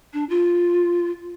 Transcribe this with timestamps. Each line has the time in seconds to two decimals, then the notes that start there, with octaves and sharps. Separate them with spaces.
0.14 D4
0.30 F4